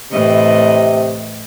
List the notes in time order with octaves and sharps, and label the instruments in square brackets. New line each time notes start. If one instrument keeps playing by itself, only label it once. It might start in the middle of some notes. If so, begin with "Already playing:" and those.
[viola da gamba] A2 E3 D#5 [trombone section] C3